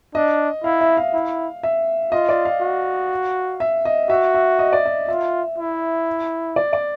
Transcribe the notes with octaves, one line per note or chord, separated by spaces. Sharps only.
D4 D#5
E4 F5
E5
F5
E4
E5
F4 D#5
D5
F5
F#4
E5
D#5
F#4 E5
E5
D#5
D5
D#5
F4 E5
E4
D5
D5